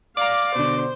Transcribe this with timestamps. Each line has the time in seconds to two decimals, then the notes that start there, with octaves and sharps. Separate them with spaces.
0.17 D5 F5 A#5 D6
0.55 B2 D3 C5